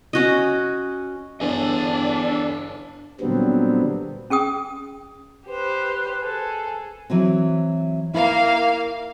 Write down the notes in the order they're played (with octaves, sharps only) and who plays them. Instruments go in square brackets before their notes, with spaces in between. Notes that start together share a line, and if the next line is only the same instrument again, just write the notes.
[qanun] C#4 F#4 D#5
[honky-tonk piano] G1 [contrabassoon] E2 [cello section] D4 [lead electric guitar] A4 G#5
[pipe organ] A#2 D3 F#3 G3 B3 C4
[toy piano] C#4 G#4 G5 D#6
[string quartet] G4 C5 [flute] B4
[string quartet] G#4 A4
[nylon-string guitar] E3 F#3 C4
[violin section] A#3 F5 [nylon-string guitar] E4